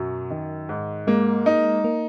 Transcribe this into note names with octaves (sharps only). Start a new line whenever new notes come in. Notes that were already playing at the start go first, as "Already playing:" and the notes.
Already playing: F#2 B2 F#3
D#3
G#2
G#3 A#3
D#4
A#3